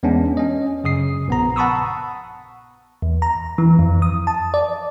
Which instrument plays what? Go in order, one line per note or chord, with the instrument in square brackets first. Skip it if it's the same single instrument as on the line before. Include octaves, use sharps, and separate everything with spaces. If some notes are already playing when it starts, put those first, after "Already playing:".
[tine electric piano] E2 G#3 B3 C#4 D4
C#4 D#5
F#2 C#3 D#6 C7
A#1 B3 A#5
F#5 A5 B5 C#6 D#6 E6
[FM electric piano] E2
A#5
E3
F2
D#6
A5
D5